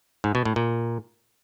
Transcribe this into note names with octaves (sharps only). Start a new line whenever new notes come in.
G#2
B2
A2
A#2